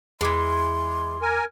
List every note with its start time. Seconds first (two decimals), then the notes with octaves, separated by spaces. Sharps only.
0.21 E2 E3 G#3 C6 D6 G#6
1.22 A#4 G#5